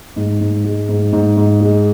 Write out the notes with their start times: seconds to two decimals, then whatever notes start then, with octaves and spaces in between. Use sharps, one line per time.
0.16 G#2
0.41 G#2
0.64 G#3
0.89 G#2
1.13 G#2
1.37 G#2
1.61 G#3